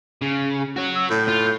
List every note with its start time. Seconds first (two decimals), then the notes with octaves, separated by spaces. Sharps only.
0.22 C#3
0.77 F#4 C#5
0.95 E6
1.10 A2 G6
1.28 F4